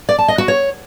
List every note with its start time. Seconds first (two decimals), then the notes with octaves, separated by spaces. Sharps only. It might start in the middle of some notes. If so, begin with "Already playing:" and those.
0.09 D5
0.19 A5
0.28 D#5
0.38 F#4
0.48 C#5